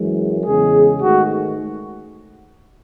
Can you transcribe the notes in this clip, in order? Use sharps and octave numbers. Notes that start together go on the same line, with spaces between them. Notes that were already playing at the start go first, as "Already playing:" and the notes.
Already playing: F#2 E3 G#3
E2 C#3 G#3 G#4
G#2 D#3 A3 F#4